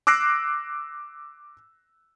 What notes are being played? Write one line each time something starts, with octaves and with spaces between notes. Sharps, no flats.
D6 E6 F#6 A#6 C7 D7